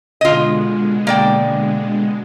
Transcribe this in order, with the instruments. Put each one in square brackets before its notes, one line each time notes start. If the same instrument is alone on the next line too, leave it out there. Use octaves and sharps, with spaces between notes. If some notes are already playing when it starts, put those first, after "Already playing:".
[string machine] B2 D3 G#3 [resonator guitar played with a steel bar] F4 D#5
[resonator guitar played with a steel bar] A#3 D5 G5